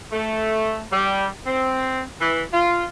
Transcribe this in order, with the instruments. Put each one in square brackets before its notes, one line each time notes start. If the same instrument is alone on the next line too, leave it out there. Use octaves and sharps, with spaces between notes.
[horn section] A3
G3
C4
E3
F4